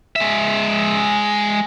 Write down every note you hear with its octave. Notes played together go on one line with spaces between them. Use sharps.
G#3 E5